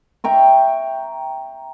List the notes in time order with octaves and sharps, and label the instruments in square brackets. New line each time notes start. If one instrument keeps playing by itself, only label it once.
[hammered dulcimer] E5 G5 A#5 C#6